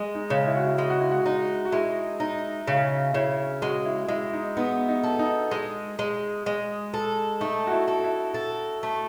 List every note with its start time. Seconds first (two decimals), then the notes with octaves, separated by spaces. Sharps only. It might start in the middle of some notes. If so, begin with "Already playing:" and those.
Already playing: G#3
0.15 D#4
0.30 C#3
0.47 E4
0.56 F#4
0.66 E4
0.78 G#3
0.90 F#4
1.00 E4
1.11 F#4
1.26 D#4
1.65 F#4
1.72 G#3 E4
2.20 D#4
2.67 C#3
3.14 C#3 E4
3.62 G#3 F#4
3.86 E4
4.08 G#3 E4
4.33 D#4
4.56 B3 D#4
4.89 D#4
5.03 A4
5.19 D#4
5.51 G#3
5.99 G#3
6.46 G#3
6.94 A4
7.40 A3 D#4
7.67 F#4
7.72 E4
7.88 A4
8.04 E4
8.34 A4
8.83 A3